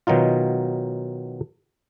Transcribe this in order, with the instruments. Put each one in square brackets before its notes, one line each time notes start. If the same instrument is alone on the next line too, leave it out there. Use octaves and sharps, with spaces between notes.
[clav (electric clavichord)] B2 D#3 F#3 D#4 F4